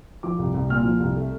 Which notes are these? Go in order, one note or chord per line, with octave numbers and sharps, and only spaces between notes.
F3 D6
C2
C2
A#2 F6
F3
C2
A3